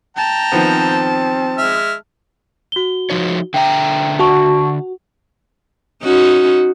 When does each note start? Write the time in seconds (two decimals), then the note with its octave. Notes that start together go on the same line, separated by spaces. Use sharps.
0.17 G5 A5 A#5
0.52 D#3 F3 B3 C4
1.58 G#3 E5 F6
2.72 F#4 G7
3.10 F3 D#4 C#5
3.54 D3 E5 G5 A#5
4.19 F#4 A5 C#6
6.03 C#4 D#4 F#4